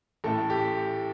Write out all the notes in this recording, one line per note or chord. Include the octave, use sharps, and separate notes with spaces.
A1 A2 A3 A4
G4